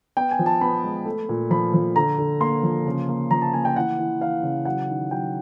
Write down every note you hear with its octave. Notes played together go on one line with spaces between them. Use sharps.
B3 G5
G#5
F3
A5
B3 B5
G#3
A3
A#2
F3 B5
F3
D3 A#5
D3
A#3 C6
F3
C#3
A#3
F3 A#5
A5
A#3 G#5
G5
E3 F#5
E3
E3 F5
C#3
F#3 F#5
D#3
F#3 G5